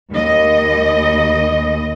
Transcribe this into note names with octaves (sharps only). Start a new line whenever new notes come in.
D#2 D#5